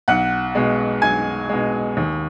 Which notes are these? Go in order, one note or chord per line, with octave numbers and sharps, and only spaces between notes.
B1 F#5 F#6
B2 G#3
B1 G#5 G#6
B2 G#3
D#2